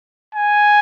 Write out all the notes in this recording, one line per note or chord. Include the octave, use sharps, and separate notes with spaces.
G#5